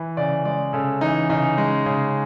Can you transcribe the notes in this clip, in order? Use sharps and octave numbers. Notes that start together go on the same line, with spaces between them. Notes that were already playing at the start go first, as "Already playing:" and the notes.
Already playing: E3
C#3 D5
G#3 D5
C#3 A4
E3 D#4
C#3 D#4
G#3
C#3